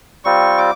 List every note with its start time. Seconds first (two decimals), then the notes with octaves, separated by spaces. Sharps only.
0.25 G3 C4 F4 C#6
0.58 D6